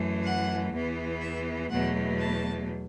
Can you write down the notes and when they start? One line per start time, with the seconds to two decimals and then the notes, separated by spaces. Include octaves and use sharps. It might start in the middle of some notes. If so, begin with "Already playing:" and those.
Already playing: F#2 E3 A3
0.22 F#5
0.71 E2 E3 B3
1.20 E5
1.69 E2 B2 F#3 A3 F#5
2.18 A5